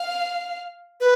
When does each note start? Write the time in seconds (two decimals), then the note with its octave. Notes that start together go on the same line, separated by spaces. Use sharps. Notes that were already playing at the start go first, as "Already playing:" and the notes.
Already playing: F5
1.00 B4